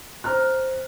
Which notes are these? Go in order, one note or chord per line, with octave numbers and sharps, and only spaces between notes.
C5 A#5 F6 F#6